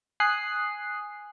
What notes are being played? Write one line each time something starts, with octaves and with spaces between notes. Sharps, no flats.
G#5 D#6 F#6 C7